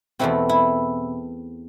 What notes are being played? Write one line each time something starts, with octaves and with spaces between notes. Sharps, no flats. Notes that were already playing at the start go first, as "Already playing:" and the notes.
E2 B2 A3 C4 E4
E4